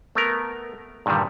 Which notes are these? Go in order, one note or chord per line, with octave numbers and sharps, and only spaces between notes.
A3 B3 A#4
G2 A#2 D3 D#3 G3